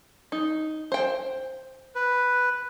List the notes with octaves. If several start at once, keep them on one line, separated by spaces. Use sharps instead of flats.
D#4
C5 G5
B4